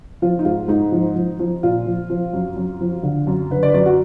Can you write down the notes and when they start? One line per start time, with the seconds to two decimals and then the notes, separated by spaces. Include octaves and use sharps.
0.22 F3 F4
0.39 D#4
0.45 G#2 F4
0.68 G#2 D#4
0.92 F3
1.16 F3
1.39 F3
1.63 A#2 F4
1.86 F3
2.10 F3
2.33 F#2
2.57 F#2
2.81 F3
3.03 D3
3.27 F#2
3.51 D3 B4
3.63 D5
3.68 B4
3.74 F#2 D5
3.86 F#4